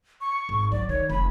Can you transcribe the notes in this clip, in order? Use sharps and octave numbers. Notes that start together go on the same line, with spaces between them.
C#6
G#1
F#3 D5
D#3 C#5
F1 B5